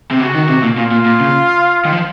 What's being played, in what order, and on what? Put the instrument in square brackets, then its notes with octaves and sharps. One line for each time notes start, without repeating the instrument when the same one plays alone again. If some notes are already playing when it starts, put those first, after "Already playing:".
[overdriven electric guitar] C3
[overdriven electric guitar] C#3 [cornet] F#4
[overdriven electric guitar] D#3
C3
A#2
[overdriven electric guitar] A#2 [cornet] F4
[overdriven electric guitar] A#2
A#2
C#3
D#3
F3